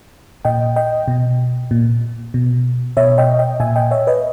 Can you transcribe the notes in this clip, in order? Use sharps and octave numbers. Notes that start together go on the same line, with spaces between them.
A#2 D#5 G5
D#5 G5
B2
A#2
B2
B2 C#5 E5
D#5 G5
D#5 G5
A#2 E5 G#5
D#5 G5
C#5 E5
B4 D#5